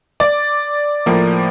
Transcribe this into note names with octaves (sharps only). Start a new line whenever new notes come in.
D5
A2 F3 A#3